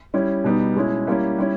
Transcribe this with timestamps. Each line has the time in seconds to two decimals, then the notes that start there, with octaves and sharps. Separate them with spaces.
0.14 G3 C#4 E4
0.44 B2 G3 B3 D#4
0.75 B2 G#3 C#4 E4
1.07 G3 A#3 C#4 E4
1.38 G3 C#4 E4